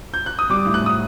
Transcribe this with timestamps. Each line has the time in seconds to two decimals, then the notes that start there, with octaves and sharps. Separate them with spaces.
0.14 G6
0.26 F#6
0.39 D#6
0.50 G3 D6
0.66 A2
0.74 F#6
0.83 A2 D#6